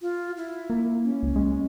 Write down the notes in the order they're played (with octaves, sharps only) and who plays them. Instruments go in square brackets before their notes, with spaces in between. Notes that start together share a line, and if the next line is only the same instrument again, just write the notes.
[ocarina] F4
E4
[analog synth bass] A#3
[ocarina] C#4
[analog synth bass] C#2
G#3